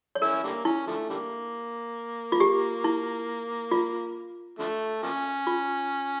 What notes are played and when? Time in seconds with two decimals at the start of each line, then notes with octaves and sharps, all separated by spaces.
0.15 C#5
0.21 C#4 E4 A#4
0.44 D3 G3 A#3
0.65 C#4 E4
0.87 D3 F3 A3
1.10 D3 G3 A#3
2.32 F4
2.40 G4
2.84 E4
3.71 F4
4.59 D3 F3 A3
5.03 F3 A#3 C#4
5.47 F4